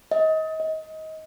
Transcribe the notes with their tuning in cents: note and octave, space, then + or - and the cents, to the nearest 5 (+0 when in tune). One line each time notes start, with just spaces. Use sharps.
D#5 +25
D#5 +20